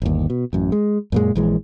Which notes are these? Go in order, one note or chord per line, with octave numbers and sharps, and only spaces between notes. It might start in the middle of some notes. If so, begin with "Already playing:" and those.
G1 D#2
B2
A1 F#2
G#3
F#2 A#2 G#3
A#1 E3 G#3